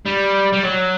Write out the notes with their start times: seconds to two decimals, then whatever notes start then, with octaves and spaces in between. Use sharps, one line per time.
0.06 G3
0.53 G3
0.63 F#3